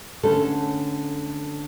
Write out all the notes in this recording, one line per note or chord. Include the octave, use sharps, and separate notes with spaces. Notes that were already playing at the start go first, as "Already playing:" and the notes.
D3 A3 C#4 A4